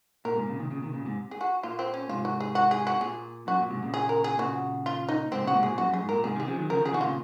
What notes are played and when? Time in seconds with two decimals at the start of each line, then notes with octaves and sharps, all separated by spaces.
0.25 A#2 A#4
0.36 G#2 C3
0.48 A#2 C#3
0.59 C3 D#3
0.70 A#2 C#3
0.82 C3 D#3
0.94 A#2 C#3
1.05 G#2 C3
1.31 G#4
1.41 F#4
1.63 A#2 F4
1.79 C4
1.94 C#4
2.09 G#2 C3 F4
2.25 F#4
2.40 G#4
2.55 F#4
2.71 G#4
2.87 F#4
3.01 A#2 G#4
3.47 F#2 F#4
3.59 A#2
3.70 G#2 C3
3.83 A#2 C#3
3.94 G#4
4.09 A#4
4.24 G#4
4.39 A#2 C#3 F#4
4.86 F4
5.08 D#4
5.32 G#2 C3 C4
5.43 A#2 C#3 F#4
5.55 G#2 C3
5.63 A#2 G#4
5.78 F#2 F#4
5.90 F#2 G#4
6.02 G#2
6.09 A#2 A#4
6.24 G#2 C3 G#4
6.35 C3 D#3 G#4
6.47 C#3 F3
6.59 D#3 F#3
6.70 C#3 F3 A#4
6.81 C#3 F3 G#4
6.93 C3 D#3 F#4
7.01 A#2 C#3 F4